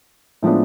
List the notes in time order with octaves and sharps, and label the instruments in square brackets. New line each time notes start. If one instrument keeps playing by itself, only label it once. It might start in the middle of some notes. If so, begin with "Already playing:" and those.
[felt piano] A2 F3 G#3 B3 D4